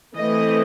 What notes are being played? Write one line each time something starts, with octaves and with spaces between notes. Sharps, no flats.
E3 A3 C4 D#5